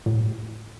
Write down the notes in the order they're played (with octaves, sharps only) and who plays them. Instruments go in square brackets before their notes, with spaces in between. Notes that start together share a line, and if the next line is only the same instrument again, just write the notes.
[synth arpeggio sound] A2